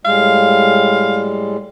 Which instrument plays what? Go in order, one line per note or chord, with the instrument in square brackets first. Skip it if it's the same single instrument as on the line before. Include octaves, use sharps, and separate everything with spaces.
[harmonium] A2 G3 G#3 [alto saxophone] F5